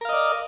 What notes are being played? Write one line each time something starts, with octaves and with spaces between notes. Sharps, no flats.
A#4 D5 D#5 F5